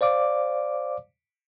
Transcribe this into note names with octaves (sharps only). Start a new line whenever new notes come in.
C5 D5 F5 D6